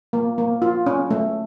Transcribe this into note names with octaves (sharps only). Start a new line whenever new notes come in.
A#3
A#3
F4
C#4
A3